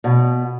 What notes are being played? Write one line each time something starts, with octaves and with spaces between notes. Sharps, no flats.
B2